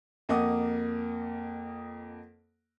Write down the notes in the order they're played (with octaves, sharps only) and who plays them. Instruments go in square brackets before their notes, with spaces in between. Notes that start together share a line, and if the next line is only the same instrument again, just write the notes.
[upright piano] F2 A#3 D#5 F#5 D6 D#6